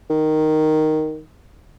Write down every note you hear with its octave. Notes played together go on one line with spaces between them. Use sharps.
D#3